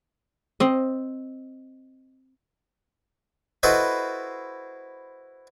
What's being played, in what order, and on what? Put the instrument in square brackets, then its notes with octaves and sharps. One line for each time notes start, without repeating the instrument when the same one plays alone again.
[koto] C4 D#5
[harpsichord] E4 F#4 A4 B4 C5 D#5